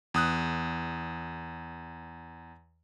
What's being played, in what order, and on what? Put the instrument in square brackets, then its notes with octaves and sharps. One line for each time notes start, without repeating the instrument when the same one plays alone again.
[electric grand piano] E2 D#6 F#6